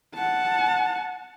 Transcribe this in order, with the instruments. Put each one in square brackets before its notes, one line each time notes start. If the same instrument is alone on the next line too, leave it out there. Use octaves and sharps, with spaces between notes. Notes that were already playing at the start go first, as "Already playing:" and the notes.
[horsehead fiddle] F#5 A5